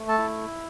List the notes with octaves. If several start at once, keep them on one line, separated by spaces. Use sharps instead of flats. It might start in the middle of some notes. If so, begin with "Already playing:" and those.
Already playing: A3
A4 A5
E4